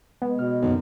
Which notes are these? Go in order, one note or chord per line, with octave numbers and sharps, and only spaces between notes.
G#3 B3
B2 C#5 F6
B1 F#2 D3